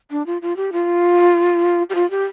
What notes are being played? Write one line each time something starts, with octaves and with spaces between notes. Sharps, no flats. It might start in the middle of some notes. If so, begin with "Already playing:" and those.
D4
F4
F4
G4
F4
G4
F4
G4